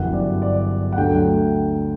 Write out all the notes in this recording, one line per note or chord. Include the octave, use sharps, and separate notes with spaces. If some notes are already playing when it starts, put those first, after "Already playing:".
Already playing: G1 F#2 E3 F#5
D5
D5
F#5
D2 D3 F#3 A3 G5